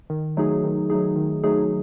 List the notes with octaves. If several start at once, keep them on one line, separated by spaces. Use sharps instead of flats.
D#3
F#3 A3 D#4 G#4
D#3
F#3 A3 D#4 G#4
D#3
F#3 A3 D#4 G#4